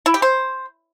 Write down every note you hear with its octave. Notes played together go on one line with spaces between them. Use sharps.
E4
G4
C5